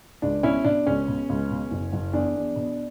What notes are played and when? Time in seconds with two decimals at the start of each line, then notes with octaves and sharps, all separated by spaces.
0.22 C#2 D4
0.43 B2 C#4 E4
0.64 B2 D4
0.87 C#2 C#4
1.08 B2
1.29 C#2
1.50 B2
1.71 F#1
1.92 F#1
2.13 E2 D4
2.35 E2
2.56 B2